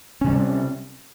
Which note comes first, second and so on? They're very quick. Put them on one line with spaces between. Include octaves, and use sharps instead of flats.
C#4 C3 G3